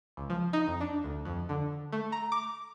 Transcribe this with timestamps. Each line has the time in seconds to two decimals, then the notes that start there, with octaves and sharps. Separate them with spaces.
0.17 C#2
0.30 F3
0.53 D#4
0.68 F2
0.81 D4
1.04 D2
1.25 F2
1.49 D3
1.92 A3
2.12 A#5
2.32 D6